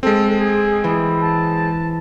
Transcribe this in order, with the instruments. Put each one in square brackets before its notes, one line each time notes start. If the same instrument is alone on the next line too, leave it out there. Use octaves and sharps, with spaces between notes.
[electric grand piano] G#3 C4 [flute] A4
[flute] G#4
[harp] E3
[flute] A5